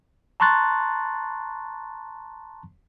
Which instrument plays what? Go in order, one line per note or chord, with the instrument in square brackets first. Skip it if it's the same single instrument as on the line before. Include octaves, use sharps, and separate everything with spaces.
[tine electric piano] A5 A#5 C6 C#6 F#6 A6